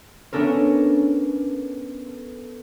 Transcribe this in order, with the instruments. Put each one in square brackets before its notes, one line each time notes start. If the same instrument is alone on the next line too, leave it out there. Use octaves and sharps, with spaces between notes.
[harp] B3 C#4 D4 A4 A#4